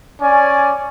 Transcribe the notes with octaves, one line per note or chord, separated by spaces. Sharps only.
C#4 D5 G#5